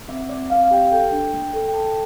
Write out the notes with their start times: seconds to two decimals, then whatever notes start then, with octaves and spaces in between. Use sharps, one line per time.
0.09 C4 E5
0.29 C4 D5
0.50 C4 F5
0.63 F5
0.71 G4 G5
0.91 A4 G5
1.12 D4
1.33 A#3
1.53 A4
1.66 G5
1.74 A4 A5